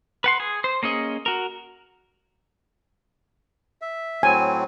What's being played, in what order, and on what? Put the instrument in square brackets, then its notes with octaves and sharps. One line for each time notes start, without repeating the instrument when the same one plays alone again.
[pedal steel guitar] B4 F#5 C6
G#4
C5
A#3 C#4 G#4 D#5
F#4 A#4
[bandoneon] E5
[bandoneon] A2 F#3 C4 [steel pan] G#5